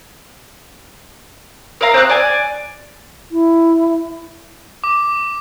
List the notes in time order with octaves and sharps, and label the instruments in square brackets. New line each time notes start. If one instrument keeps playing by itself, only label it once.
[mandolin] A#4 E5 F5 A#5
C4 G#4 D6 F#6
D5 G#5
[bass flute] E4
[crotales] D6